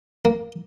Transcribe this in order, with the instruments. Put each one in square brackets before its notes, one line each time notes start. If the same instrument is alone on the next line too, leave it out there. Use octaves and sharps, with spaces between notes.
[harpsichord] A#3